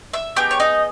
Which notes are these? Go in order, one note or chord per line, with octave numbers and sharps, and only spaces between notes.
E5 E6
B3 D#4 G4 G#4 G5
C#5
D#4 D#5